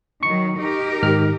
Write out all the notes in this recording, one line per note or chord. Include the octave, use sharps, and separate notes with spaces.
D#3 F#3 C#6 C#7
D#4 G4 A#4
G#2 D#3 F6